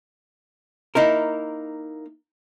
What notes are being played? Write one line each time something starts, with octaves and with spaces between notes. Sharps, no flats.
A#3 D#4 E4 A#4